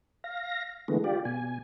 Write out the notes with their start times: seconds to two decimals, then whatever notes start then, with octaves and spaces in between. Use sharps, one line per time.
0.24 F5 A#6
0.88 D3 E3 G#3 A3 B3
1.04 F4 G4 D5
1.25 B2 G#5